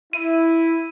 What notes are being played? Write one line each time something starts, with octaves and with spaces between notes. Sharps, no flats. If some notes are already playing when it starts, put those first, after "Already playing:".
E4 D#7